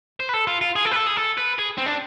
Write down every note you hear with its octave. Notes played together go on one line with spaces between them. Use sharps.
C5
B4
A4
F4
F4
G#4
A4
B4
A4
G#4
A4
B4
G#4
C4
D4